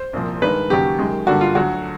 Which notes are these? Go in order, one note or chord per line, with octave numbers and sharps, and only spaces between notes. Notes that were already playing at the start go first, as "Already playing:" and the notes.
Already playing: C5
C2 A#2 F3
G2 D#3 G#3 B4
D#2 C#3 F#3 G4
F#2 D#3 G#3
G2 D3 G3 A#3 F#4
F4
D2 D3 F#3 F#4